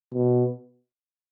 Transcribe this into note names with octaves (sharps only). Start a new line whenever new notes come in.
B2